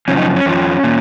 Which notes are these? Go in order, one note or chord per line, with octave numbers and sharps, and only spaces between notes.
F#2 C#3 F3 C#4
D#4
C#4
F2 F3
A#2